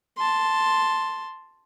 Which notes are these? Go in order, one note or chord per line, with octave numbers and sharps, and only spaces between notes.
A5 C6